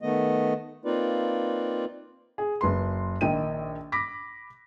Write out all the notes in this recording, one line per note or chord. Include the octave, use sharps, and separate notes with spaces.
D#3 A3 B3 D#5
A#3 C4 D#4 F4 B4 D5
G#4
F#1 B4 C6
A#1 D#3 G5 D#7
B5 D6 A#6 B6